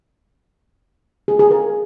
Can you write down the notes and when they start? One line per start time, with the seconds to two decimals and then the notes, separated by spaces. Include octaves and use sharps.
1.28 G#4
1.39 G#4
1.51 A#4